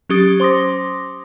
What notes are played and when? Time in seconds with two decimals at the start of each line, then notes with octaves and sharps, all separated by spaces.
0.09 F#3 C#4 G4 D#6 A6
0.40 C5 C6 D6 D#6 A#6